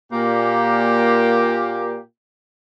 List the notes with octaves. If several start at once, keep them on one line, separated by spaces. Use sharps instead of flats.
A#2 A#3 G4